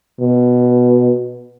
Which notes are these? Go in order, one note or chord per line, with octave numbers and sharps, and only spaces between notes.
B2